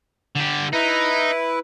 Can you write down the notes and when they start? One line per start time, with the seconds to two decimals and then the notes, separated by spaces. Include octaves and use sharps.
0.36 D3 G4
0.73 D#4 E4 B4